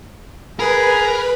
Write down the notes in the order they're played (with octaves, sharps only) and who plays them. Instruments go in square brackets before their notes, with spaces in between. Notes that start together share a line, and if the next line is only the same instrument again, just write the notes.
[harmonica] G#4 [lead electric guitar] A#4 [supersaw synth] B4 B5